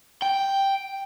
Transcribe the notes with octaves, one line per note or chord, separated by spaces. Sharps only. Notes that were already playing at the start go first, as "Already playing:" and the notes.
G5